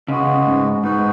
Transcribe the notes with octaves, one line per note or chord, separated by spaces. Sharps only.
C#3 G#3 B3 F#4
G#2
G#2 B3 D#4 F#4 B4